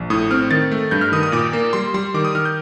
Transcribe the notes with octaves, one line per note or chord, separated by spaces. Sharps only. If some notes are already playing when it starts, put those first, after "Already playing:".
Already playing: A#1
A2 D#6
C4 F6
D#3 A6
A3
G2 G6
F6
D#3 D#6
D#6
A#2 D6
A#3
G3 C6
G3 C6
D#3 D6
D#6
D#3 F6
G6